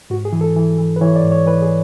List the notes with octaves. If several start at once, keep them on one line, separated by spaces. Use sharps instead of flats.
G#2 F#4
G#4
E3
A4
E3
E3
B4
E3 C#5
D5
G#2
C#5
E3 B4
G#4